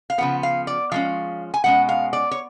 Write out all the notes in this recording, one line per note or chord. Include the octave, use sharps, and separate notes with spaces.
F5
C#3 F3 B3 F#5
F5
D5
F3 G#3 C#4 F5
G#5
B2 G#3 C#4 F#5
F5
D5
C#5